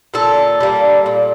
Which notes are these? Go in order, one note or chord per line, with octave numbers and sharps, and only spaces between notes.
A#2 A4
G3 A#3
A#2